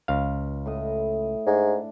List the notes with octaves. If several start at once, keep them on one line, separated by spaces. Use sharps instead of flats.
C#2 F5
A2 D#5
G#2 D4